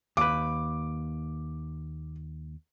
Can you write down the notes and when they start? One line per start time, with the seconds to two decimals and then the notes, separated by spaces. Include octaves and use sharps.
0.17 D#2 B4 D6